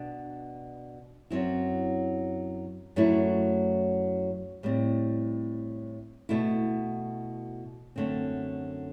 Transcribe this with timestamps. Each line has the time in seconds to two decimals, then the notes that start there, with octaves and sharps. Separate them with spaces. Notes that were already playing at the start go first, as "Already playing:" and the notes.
Already playing: B2 D4
1.30 F#2 F#3 C4 E4
2.96 F#2 F#3 A3 E4
4.63 A2 G3 C4
6.29 B2 A3 E4
7.96 F#2 D3 A3 C4